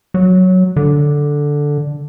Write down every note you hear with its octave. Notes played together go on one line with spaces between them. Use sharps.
F#3
D3